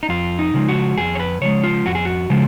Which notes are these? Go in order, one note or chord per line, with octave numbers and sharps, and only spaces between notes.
D#4
F2 F4
D#4
C#3 F3 G#3
F#4
F2 G#4
C#5
B4
C#3 F3 G#3 C#5
F4
F2 F#4
G#4
F#4
C#3 F3 G#3